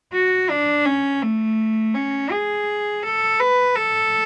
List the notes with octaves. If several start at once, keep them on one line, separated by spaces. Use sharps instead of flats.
F#4
D4
C#4
A3
C#4
G#4
A4
B4
A4